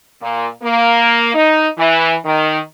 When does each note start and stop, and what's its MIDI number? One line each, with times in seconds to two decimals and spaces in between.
0.21 0.47 46
0.63 1.32 58
1.34 1.67 63
1.78 2.15 52
2.25 2.58 51